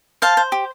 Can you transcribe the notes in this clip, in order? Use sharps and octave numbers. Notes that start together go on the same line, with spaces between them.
C5 F5 A5
C5
G4